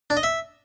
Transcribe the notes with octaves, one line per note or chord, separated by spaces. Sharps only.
D4
D#5
E5